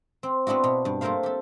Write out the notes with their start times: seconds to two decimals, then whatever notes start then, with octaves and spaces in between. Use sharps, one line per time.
0.23 C4
0.47 B3 C4 D4 E4 F#4
0.64 B2
0.85 G2
1.01 A3 A#3 C4 A#4 C5 F5
1.23 G4 A4